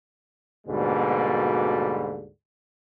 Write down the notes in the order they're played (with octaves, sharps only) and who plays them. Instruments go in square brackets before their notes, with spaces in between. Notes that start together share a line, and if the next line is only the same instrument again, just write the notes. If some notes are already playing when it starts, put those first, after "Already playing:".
[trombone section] D2 G#2 B2 D3 G3 A#3